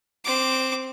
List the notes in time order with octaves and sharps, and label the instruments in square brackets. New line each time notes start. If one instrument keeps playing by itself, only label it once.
[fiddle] C4 D6